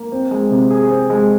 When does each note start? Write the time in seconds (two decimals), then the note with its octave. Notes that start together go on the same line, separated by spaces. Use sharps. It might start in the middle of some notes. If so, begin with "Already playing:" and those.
Already playing: A#3
0.12 C4
0.31 G#3
0.51 C3
0.70 G#4
0.91 C4
1.10 G#3